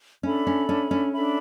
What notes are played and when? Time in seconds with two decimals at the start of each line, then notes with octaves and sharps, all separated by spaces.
0.23 C#4 D4 A4 E5 B5
0.47 C#4
0.69 C#4
0.91 C#4
1.13 D4 A4 E5 B5